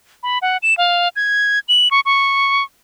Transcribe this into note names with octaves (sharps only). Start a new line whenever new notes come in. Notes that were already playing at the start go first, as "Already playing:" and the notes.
B5
F#5
E7
F5
G#6
F#7
C#6
C#6